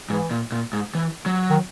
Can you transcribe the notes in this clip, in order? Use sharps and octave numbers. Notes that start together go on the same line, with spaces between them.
G#2 E3
A#2
A#2
G#2
E3
F#3
D#3